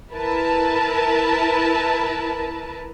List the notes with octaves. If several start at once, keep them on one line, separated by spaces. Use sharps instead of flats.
E4 A#4 B4 A5